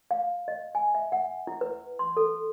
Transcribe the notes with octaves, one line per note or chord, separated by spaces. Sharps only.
F5
D#5
G#5
E5
F#5
E4
B4
C6
A4